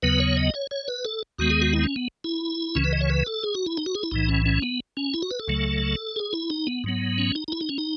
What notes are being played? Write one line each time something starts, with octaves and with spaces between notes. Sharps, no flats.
D#2 C#3 F#3 B3 B4
C#5
D#5
C#5
C#5
B4
A4
D#2 D#3 G#3 B3 F#4
G#4
F#4
E4
B3
C#4
B3
E4
C#2 C#3 E3 C#4
B4
D#5
C#5
B4
A4
G#4
F#4
E4
D#4
F#4
G#4
E4
B1 A2 E3 D#4
C#4
C#4
B3
C#4
E4
F#4
B4
A4
C#2 C#3 F#3 A3
G#4
E4
D#4
B3
G#2 F#3 B3
C#4
D#4
D#4
E4
D#4
C#4
D#4